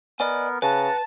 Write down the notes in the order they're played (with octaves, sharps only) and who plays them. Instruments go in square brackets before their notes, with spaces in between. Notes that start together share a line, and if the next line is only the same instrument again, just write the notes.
[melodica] B3 A#4 [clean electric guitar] D5 D#5 G#5
[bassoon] C#3 [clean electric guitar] B4 [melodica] F#5 A#5 [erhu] A5